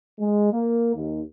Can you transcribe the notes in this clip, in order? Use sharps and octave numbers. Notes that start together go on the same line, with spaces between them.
G#3
A#3
D#2